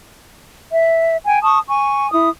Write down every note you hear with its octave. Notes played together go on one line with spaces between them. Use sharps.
E5
G5 G#5
A5 C#6 D#6
G#5 C#6
E4 D#6